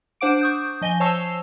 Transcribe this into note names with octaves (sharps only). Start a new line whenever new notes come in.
D4 C5 F#5 D6 D7
C#6 D#6 G6
F3 D#5 G#5 A#6 G7
C5 C#5 A5 C#6 E6 C7